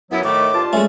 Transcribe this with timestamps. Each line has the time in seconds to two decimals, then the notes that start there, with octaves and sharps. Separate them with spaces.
0.11 F#2 E3 F#3 B3 E4
0.24 A2 D#3 A3 D6
0.54 G2 F4 A5
0.73 G#3 A3 C#4